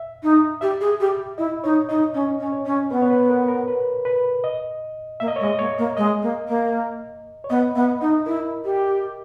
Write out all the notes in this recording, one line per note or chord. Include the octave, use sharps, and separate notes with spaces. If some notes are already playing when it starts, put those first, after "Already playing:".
Already playing: E5
D#4
G4 E5
G#4
G4
E4 D#5
D#4 C#5
D#4 D#5
C#4 D#5
C#4
C#5
C#4
B3 B4
C#5
B4
A#4
A#4
B4
B4
D#5
A#3 E5
D#5
C#5
G#3
D#5
A#3 C#5
A#3
G#3 D#5
A#3
A#3
C#5
B3 D#5
B3 E5
D#4 D#5
E4 A#4
G4